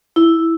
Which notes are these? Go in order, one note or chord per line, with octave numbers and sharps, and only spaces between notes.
E4